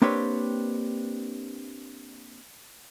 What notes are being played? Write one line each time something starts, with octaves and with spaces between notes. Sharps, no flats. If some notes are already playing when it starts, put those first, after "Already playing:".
A#3 C4 D4 G4 B4 C#5